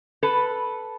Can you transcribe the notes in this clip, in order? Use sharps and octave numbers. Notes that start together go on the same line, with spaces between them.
A4 B4